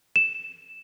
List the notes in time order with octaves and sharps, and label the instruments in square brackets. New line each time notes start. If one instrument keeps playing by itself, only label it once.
[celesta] E7